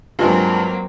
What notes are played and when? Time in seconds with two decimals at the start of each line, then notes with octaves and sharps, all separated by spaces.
0.19 G2 F#3 G#3 A#3 C4 F4